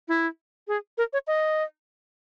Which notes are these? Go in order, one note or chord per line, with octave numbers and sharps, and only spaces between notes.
E4
G#4
A#4
C#5
D#5